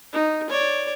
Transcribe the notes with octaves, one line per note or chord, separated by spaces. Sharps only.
D#4
C#5 D5